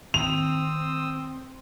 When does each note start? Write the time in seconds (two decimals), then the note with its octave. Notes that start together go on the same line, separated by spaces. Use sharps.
0.14 D#3 C4 G5 D#6 E6 F7